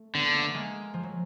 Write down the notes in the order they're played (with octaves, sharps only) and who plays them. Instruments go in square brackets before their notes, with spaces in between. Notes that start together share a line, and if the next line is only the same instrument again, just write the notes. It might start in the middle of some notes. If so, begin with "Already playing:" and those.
Already playing: [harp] A3
[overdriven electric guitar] D3 [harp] B3
[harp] A#3
A3
G#3 A#3
F3
F#3